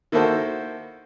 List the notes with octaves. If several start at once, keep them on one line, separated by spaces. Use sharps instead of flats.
D#3 A#3 E4 F#4 A4 C5